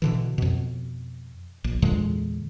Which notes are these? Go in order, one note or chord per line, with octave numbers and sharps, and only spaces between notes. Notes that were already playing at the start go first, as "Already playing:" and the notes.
B2 D3 E3
F2 B2
A#1
E2 A#2 D3 G#3